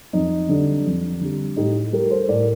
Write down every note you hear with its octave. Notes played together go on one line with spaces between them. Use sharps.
F2 D#4
D3 G3
F2
D3 G3
A2 D#4 G4
G3 G4 A#4
A4 C5
A2 A#4 D5